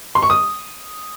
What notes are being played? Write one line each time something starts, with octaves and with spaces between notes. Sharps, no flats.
C6
C#6
D#6